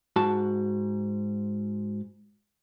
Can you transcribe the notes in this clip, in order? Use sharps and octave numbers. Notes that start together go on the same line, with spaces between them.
G#2 F#4 A5